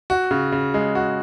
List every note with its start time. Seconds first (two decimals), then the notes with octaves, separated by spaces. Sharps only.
0.10 F#4
0.31 C#3
0.52 C#3
0.74 G#3
0.95 F#4